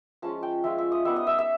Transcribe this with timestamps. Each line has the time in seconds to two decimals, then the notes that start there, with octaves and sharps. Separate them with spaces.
0.22 F3 G#3 C#4 F4 A5
0.43 G5
0.64 F3 G#3 C#4 F4 E5
0.78 E5
0.92 D#5
1.05 G3 B3 D#4 E5
1.16 D#5
1.27 E5
1.39 E5